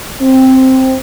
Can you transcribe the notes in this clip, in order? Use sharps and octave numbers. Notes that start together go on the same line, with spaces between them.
C4